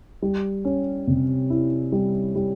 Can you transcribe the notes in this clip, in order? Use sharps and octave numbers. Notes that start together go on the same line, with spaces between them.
G3
C#4
C3
E4
G3
G3